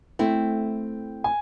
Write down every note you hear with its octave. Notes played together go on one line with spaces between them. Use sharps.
A3 C4 E4 G5
G#5